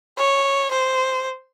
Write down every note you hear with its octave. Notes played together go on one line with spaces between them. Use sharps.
C#5
C5